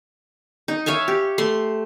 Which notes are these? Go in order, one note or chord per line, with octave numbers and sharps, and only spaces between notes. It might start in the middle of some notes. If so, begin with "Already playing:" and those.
D#4
C#5 E5 F5 G#5
G4
A3 C6